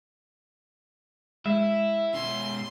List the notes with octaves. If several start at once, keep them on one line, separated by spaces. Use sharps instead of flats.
G#3 E4 E5
B2 C#4 C6